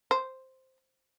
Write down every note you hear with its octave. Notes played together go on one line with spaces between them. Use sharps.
C5